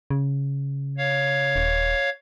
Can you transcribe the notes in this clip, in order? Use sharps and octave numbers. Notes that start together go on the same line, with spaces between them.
C#3
C#5 F5
D#1